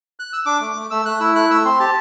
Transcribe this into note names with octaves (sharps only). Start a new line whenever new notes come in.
F#6
E6
D4 D6
A3
A3
A3 E6
A3 F#6
E4 E6
A3 F#6
A3 E6
C4 C6
G4 A5